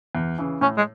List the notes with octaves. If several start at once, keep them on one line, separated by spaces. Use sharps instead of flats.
E2
C#3 E3
A2 C#4
G#3